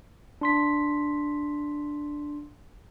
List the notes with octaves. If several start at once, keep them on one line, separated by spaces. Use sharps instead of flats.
D4 C6 B6